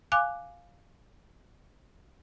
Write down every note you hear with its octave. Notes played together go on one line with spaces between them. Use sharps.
F5 G#5 D6 F#6